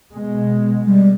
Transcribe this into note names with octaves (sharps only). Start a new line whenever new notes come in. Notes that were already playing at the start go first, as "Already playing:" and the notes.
B2 G#3
G3